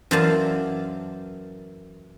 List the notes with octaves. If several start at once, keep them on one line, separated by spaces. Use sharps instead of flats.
F#2 E3 C5 D5 F5 A5